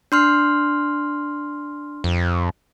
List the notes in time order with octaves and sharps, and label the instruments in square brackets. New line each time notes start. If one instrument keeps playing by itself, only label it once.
[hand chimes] D4 C6 F6
[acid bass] F2